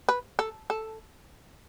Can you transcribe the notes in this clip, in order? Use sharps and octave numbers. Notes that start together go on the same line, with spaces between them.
B4
A4
A4